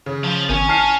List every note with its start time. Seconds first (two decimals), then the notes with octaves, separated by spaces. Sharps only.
0.06 C#3
0.24 F3
0.49 G#1 C#4
0.69 A5 F6 C7